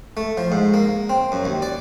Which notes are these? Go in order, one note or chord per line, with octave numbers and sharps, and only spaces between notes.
A3
F3
G#2
A#3
C4
F#2
D#2
D5